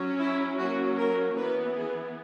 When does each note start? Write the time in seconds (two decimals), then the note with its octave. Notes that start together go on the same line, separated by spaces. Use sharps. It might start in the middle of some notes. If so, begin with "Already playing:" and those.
Already playing: F#3 C#4
0.20 E4
0.59 F#3 A#3 C#4 F#4
0.98 A#4
1.36 E3 B3 B4
1.76 G#4